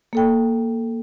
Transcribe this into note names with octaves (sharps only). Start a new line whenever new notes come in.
A#3 A4 G5